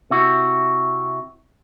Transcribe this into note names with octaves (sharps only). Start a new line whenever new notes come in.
C3 E4 F#4